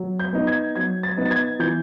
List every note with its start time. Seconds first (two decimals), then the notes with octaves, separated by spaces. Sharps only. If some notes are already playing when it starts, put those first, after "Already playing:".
Already playing: F#3
0.20 G6
0.33 B3 D#4
0.47 G#6
0.76 F#3 G#6
1.03 A6
1.17 B3 D#4
1.25 A6
1.31 G#6
1.59 E3 G6